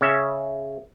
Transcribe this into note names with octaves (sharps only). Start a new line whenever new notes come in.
C#3 C#4 E5